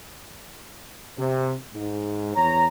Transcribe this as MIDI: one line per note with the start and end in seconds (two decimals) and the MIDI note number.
1.19 1.54 48
1.74 2.32 44
2.35 2.66 40
2.35 2.66 73
2.35 2.66 82